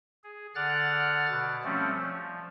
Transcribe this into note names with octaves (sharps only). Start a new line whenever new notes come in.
G#4
D3 D5 F#5 F6 F#6 A6
B2
F3 G3 A3 C4 C#4
F3